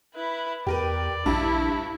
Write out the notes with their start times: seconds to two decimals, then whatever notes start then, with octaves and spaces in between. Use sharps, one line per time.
0.15 E4 B4
0.67 E2 G4 A#4 B4 D5
1.26 A#1 G2 E4